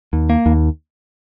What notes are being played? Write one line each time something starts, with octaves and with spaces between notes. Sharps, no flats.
D#2
A#3
D#2